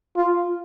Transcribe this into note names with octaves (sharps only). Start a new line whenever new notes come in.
F4